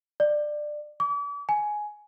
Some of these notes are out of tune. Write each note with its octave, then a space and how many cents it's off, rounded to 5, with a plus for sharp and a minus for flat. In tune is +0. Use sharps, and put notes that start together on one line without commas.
D5 +20
D6 -40
G#5 +10